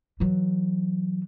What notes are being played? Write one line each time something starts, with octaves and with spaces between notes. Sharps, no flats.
E3 F#3